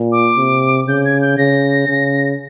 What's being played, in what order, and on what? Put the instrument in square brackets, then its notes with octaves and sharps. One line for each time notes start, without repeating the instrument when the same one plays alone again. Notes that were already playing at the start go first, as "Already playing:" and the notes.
Already playing: [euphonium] A#2
[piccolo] D6
[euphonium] C3
[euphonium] C#3 [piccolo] G6
[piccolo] G#6
G6
[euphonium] C#3 [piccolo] A#6
[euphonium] C#3